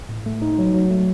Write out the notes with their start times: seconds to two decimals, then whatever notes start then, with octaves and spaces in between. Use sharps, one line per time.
0.09 A2
0.26 A3
0.42 D#4
0.58 F#3
0.74 F#3
0.91 A3